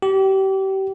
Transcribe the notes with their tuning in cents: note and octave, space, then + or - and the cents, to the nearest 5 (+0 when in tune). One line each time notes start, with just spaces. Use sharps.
G4 -30